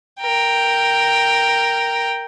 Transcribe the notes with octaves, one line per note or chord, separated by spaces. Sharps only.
A#4 G5